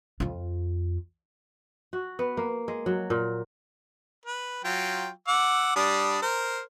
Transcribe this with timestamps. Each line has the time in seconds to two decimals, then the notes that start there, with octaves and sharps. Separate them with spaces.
0.20 F2 F4
1.93 F#4
2.19 B3
2.37 A#3
2.68 G#3
2.86 F#3
3.10 A#2
4.25 B4
4.64 F#3 F4 G5
5.28 F#5 D6 E6
5.76 G3 D4 D#6
6.22 A#4 C5